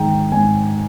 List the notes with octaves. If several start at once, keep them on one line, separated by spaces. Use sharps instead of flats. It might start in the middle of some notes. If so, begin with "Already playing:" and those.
Already playing: G#2 D#3 G#3 G5 A#5
G#2 G#5